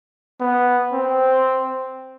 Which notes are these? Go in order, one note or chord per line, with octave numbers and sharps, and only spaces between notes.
B3
C4